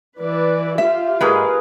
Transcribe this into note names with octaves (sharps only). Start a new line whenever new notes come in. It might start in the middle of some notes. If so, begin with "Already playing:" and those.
E3 B4 D5
F4 G4 E5 F5
G#2 G#3 G#4 A#4 B4